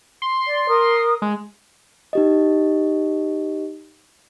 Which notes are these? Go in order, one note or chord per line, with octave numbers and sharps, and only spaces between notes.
C6
D5
A#4 D#6
G#3
D#4 G4 D#5